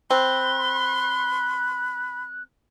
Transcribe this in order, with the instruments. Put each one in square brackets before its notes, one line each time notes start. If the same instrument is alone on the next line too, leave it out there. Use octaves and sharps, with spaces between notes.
[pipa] C4 [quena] B5 [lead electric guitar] C6 [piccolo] F#6